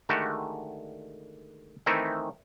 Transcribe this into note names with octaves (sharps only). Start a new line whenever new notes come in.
D3 D#3 G#3 A3 F#4 G4
D#3 E3 A3 C4 D#4 E4